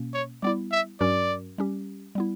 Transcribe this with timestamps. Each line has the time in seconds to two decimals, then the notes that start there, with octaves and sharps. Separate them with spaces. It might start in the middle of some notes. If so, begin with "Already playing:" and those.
Already playing: B2 A#3 C#4
0.14 C#5
0.43 G3 B3 E4 D5
0.72 E5
1.01 G2 F#3 C#4 F#4 A#4 D5
1.58 G3 C#4 G4
2.15 G3 B3 E4